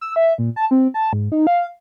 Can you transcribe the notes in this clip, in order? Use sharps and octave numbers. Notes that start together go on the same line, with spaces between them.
E6
E5
A#2
A5
C4
A5
G#2
D#4
F5